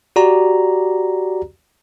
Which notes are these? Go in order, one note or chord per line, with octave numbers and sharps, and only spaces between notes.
F#4 G4 D5 A#5